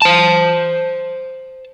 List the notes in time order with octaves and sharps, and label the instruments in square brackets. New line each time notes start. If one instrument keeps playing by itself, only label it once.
[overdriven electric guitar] C5 A5